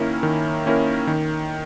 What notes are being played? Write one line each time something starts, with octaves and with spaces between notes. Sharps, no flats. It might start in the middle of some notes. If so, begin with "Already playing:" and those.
Already playing: D#3 A#3 C#4 E4 A#4
D#3
A#3 C#4 E4 A#4
D#3